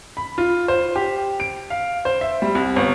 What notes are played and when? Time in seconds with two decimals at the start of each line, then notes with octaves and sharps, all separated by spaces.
0.17 B5
0.38 F4
0.68 C5
0.96 G4
1.40 D7
1.70 F5
2.05 C5
2.21 E5
2.42 G3
2.55 C2
2.76 G1